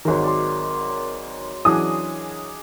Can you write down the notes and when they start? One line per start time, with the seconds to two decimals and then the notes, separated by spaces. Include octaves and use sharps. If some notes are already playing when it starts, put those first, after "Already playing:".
0.05 G#1 D#3 F#3 G#3 A#4
0.24 D5 C6
1.65 E3 F#3 C#4 D4 G#4 D#5 D#6